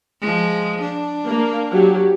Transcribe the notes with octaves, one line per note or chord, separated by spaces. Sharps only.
F3 G#3
D4
A#3
F#3 G4